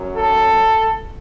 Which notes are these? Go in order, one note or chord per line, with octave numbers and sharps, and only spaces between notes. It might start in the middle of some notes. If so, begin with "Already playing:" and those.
Already playing: F#2 F#3
A4